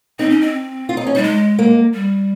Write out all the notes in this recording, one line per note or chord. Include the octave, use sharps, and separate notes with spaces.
C4 D#4
C#4
C4
F4
D#4
C#4
G3 D#4
G#3
A#3
G3